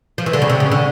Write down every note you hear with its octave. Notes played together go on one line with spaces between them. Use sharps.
F3
E3
D3
C#3
C3
C#3
D3